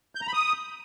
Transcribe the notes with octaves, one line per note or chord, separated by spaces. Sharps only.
G6
A#5
B5
D#6